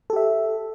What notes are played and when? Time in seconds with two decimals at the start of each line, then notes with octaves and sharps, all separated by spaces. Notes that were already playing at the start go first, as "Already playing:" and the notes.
0.10 A4
0.13 G4
0.16 E5